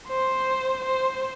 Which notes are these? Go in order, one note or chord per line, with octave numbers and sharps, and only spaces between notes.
C5
C5